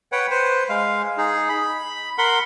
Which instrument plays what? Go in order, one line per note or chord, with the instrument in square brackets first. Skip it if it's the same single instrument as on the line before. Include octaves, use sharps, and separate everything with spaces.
[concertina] B4 C#5 F#5 G5
B4 C5
G#3 F5
D#4 G#4
B5
A#4 F#5 B5 C6